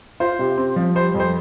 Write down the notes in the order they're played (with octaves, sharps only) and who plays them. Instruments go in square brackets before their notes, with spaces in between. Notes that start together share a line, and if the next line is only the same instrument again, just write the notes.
[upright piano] F4 [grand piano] C5
[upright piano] C3
C4
F3
[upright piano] G3 [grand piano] C5
[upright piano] F2
[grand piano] C5